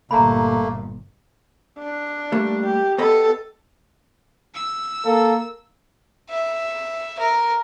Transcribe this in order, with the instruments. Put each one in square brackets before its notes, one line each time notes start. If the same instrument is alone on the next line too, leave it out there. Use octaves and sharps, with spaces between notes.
[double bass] G1 A#2 [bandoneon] A3 A#3 [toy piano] A#5 B5
[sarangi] D4
[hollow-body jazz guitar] G3 A3 A#3
[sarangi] G4
[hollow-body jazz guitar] B3 D#5 B5 [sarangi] A4
[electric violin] E6
[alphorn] A#3 [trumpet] A4
[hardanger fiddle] E5
A#4